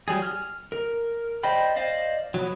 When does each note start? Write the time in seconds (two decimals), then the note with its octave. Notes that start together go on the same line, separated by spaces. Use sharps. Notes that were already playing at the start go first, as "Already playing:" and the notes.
0.08 F#3 G3 G#4
0.22 F6
0.72 A#4
1.43 C5 D5 D#5 G5 B5
1.76 C5 D5 D#5 F5
2.34 F#3 B3